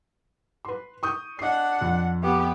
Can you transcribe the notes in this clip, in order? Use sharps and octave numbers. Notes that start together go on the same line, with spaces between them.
B4 C6
C#6 D#6 G6
D4 D#5 F#5 C7
F2
B3 G4